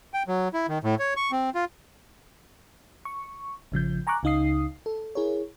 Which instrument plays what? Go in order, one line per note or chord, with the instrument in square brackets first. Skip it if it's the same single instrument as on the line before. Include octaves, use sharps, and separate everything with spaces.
[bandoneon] G5
F#3
E4
D#3
A2
C#5
C#6
C4
F4
[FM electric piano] C#6
A1 C#3 F3 G6
G#5 A#5 C#6 D6 F#6
C#2 C#3 D#4 F5 D#6 C7
A4
E4 G#4 A#4 C#5